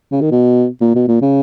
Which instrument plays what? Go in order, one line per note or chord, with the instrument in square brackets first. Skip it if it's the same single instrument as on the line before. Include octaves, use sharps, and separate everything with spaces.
[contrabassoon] C#3
D#3
B2
A#2
B2
A#2
C#3